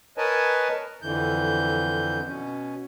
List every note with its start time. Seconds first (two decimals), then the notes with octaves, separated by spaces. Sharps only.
0.17 A#4 B4 C#5 D#5 G#5 A5
1.02 F2 D3 E3 G6
2.27 B2 C#4